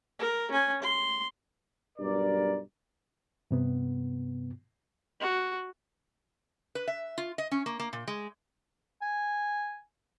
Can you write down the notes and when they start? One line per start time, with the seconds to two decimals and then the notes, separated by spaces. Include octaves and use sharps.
0.20 A#4
0.51 C#4 G#5
0.82 C6
1.98 B1 G2 A#4 D5
3.51 G2 C3 B3
5.21 F#4
6.75 B4
6.87 E5
7.18 F4
7.38 D#5
7.51 C#4
7.66 A#3
7.80 A#3
7.93 A#2
8.08 G#3
9.02 G#5